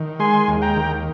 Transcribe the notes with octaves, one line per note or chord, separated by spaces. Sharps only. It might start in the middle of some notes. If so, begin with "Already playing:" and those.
Already playing: D#3
G#3 G#5 C6
D#2
G5 A#5
D#3